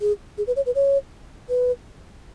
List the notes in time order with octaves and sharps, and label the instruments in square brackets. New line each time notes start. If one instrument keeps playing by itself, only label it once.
[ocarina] G#4
G#4
B4
C#5
B4
C#5
B4